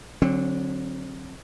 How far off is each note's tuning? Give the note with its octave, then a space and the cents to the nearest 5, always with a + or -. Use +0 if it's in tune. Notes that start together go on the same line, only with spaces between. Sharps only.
D3 -5 F#3 +0 C4 +30